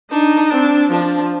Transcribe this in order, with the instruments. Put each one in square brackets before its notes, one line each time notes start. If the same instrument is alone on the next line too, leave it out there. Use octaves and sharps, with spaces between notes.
[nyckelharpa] D4 [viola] D#4
[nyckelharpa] C4 [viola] D4
[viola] F3 [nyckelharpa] D4